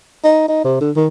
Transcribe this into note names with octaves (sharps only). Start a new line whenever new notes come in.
D#4
D#4
C3
D3
D#3